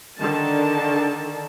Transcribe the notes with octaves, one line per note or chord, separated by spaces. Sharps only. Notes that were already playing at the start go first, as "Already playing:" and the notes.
D3 D#3 A5